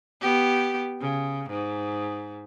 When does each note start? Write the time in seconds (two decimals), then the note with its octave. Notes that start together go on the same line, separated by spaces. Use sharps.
0.21 B3 G4
1.00 C#3
1.50 G#2